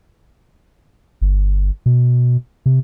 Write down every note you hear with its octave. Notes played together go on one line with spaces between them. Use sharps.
G1
B2
C3